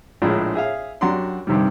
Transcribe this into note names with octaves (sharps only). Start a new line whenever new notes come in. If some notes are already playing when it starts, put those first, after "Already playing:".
A#1 A2 G#3 D4 F4
G#4 E5 F5
F#2 D4 F#4 G4 A#5 C6
G2 C3 D#3 G3